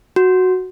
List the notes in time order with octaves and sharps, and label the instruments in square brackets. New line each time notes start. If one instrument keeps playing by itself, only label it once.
[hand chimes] F#4